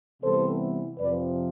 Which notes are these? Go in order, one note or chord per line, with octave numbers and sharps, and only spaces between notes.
C3 E3 G3 B3 A4 C5
F2 C3 F3 B4 D5